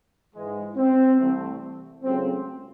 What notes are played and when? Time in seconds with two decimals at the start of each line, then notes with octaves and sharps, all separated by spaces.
0.35 G#2 E3 G#3
0.77 C4
1.19 C2 C3 E3 A3
2.04 C#2 C#3 F#3 A3 C4